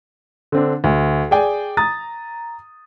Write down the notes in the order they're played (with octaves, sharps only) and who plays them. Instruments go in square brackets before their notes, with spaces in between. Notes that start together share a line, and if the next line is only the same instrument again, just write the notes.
[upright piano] D3 C4 D4
D2
G#4 D5 G5 G#5
A#5 D#6 A6